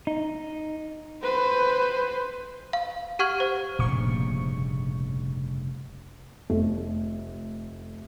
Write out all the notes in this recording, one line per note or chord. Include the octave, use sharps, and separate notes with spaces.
D#4
B4 C5
F5
G4 F#5 C#6 F6 G#6 F#7
C5
F1 G2 A#2 C#3 C#6
F1 A3